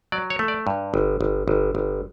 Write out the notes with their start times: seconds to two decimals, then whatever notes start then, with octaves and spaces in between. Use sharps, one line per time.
0.12 F#3 D5
0.30 C#5
0.39 A3
0.48 D5
0.67 G2
0.94 G1
1.21 G1
1.48 G1
1.75 G1